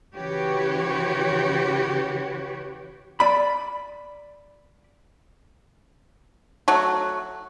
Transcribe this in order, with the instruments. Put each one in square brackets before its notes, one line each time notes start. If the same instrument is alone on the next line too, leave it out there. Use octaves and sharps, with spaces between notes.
[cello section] C#3 E3 F#4 G4 B4 C#5
[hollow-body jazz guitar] D5 B5
[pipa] F#3 A3 F#4